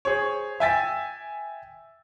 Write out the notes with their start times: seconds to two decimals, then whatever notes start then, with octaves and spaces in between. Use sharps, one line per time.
0.05 G#4 C5 C#5
0.60 E5 G5 G#5 E6 A6 B6